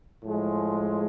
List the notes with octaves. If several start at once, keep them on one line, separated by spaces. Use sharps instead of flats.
A2 F3 G#3